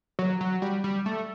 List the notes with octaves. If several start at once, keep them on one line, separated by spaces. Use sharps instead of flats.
F#3
F#3
G3
G3
A3